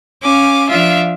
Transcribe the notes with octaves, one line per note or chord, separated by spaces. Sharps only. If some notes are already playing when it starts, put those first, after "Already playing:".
C#4 F5 G#5 D6
F3 D4 F4 E5 F5